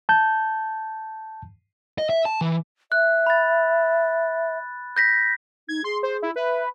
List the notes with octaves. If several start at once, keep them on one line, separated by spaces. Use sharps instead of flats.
A5 G6
D#5
E5
A5
E3
E5 F#6
B5 A6
G6 A#6 B6
D#4 G#6
G#4 C6
C5
E4
B4 E5